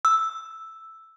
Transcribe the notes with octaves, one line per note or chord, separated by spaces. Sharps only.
E6